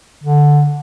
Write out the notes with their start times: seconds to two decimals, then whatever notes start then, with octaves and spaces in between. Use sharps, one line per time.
0.23 D3